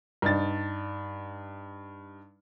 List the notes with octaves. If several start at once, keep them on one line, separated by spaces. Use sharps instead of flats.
G2 D#4 A6